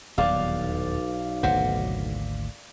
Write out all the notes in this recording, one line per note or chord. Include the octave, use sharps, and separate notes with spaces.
D#1 B1 E2 D5 F5
G#1 D2 A#2 C5 F#5